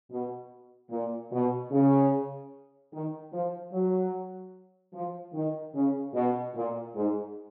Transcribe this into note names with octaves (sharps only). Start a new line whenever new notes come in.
B2
A#2
B2
C#3
D#3
F3
F#3
F3
D#3
C#3
B2
A#2
G#2